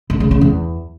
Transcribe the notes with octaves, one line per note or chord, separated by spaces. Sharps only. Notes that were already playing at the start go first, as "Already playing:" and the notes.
D3
C#3
C#3
E2